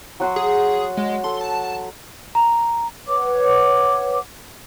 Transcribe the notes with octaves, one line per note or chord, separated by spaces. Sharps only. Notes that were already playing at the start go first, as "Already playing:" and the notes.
F#3 F#4 C6
G#4
G#3
A4 C6
A5
A#5
B4 C#5 F#5 D6